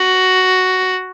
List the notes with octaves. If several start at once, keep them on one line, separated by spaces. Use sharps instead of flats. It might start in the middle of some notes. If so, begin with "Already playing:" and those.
Already playing: F#4